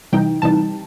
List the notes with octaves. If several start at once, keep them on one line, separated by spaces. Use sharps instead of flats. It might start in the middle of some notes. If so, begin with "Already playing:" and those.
C3 E3 G3 D#4 G5
C3 E3 G3 D#4 A5